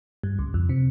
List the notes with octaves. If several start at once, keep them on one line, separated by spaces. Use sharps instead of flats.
G2
C#2
F2
C3